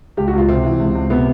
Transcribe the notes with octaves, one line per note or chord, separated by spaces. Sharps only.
C#2 G4
F#4
C#2 F4
C3 C4
E3
C#2
C#2
C3 B3